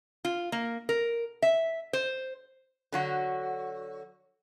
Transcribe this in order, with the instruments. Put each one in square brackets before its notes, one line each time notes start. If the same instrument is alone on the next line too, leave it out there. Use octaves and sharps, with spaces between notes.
[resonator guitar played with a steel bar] F4
A#3
A#4
E5
C5
D3 F#3 F#4